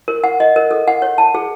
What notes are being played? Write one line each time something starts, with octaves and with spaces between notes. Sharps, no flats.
A#4
F#5
D#5
A#4
A4
F#5
C#5
A5
G#4